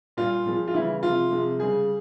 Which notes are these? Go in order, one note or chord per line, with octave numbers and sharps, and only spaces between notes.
A#2 G3 F4
A#2 F3 G#3
F4
C#3 E3 G3 E4
C3 F3 G#3 F4
C3 F3 G#3
C#3 G3 G#4